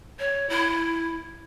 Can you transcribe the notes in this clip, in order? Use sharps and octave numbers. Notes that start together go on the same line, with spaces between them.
C#5
E4